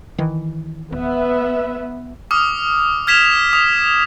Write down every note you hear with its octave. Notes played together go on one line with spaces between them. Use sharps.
D#3 E3
D1 B3 E5
D6 D#6 F6
F6 G#6 B6 E7 F7
D#6 F7